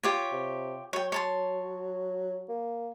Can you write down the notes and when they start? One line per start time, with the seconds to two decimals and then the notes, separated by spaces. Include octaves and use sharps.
0.03 F4 G4 C#5
0.32 C3
0.93 F#3 C#5 G5
1.12 C#5 A5 C6
2.49 A#3